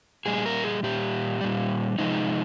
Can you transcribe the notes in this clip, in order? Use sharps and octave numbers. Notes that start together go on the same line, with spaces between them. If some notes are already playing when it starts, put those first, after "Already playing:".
A#2 G3 G#4
A#4
G#4
A#2 G3 G4
A#2 G3
C3 F3 G#3 D#4